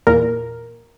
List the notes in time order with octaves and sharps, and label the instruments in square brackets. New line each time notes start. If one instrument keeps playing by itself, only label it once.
[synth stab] E2 A#2 A#4